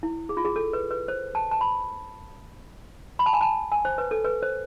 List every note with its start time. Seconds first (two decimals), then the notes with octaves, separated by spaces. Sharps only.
0.03 E4
0.29 G#4
0.37 F4
0.45 G#4
0.56 A4
0.73 B4
0.91 B4
1.08 C5
1.35 A5
1.51 A5
1.61 B5
3.19 B5
3.26 A5
3.33 G#5
3.41 A5
3.72 G#5
3.85 C5
3.98 B4
4.11 A4
4.25 B4
4.42 C5